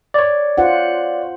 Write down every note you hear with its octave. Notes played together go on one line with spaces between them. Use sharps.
C#5 D5
F4 C5 F#5